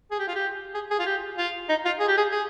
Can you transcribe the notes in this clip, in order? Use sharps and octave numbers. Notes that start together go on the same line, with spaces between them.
G#4
G4
F4
G4
G#4
G#4
F4
G4
F4
D#4
F4
G#4
G4
G#4
G#4